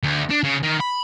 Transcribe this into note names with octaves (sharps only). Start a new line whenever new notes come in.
D2
D4
C#3
D#3
B5